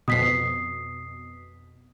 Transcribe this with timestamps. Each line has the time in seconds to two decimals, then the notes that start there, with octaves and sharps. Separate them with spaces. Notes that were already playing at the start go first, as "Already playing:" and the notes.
0.08 F2 B2 D#6 B6 C7